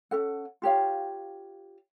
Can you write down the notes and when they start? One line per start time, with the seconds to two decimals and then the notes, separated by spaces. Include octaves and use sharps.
0.11 C#4 A4 F#5
0.62 F4 G4 C#5 F5